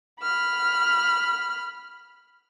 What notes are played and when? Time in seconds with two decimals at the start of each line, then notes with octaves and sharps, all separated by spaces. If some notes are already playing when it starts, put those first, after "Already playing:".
0.21 B5 F6